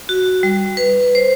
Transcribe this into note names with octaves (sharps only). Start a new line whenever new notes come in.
F#4
G3
B4
C5